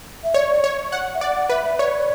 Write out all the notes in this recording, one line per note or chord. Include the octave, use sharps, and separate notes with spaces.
E5
C#5 D5
D5
C#5
F#5
E5
D5 F#5
F#5
B4 E5
E5
C#5 D5